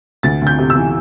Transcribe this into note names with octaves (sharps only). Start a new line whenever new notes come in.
D2 A6
D2
G6
C3
E6
E3